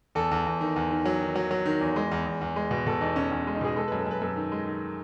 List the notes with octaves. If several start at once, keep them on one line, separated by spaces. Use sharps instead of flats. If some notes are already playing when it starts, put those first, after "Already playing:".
E2 A4
E2
E2
D#3
E2
D#3
F#3
D#3
F#3
F#3
D#3
E2
G#3
E2
E2
E2
G#3
B2
B2 A4
E2 D#4
E2 C#4
E2 C#4
D#4
G#3
D#4
B2 G#4
G#3 A4
F#2 B4
A4
F#2 B4
F#2 A4
D#3
G#3
D#3